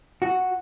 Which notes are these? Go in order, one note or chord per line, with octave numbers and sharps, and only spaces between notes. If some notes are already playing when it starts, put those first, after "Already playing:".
F#4